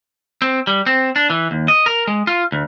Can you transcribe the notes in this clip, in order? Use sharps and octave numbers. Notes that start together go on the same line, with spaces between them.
C4
G3
C4
D4
E3
D#2
D#5
A#4
G#3
F4
D2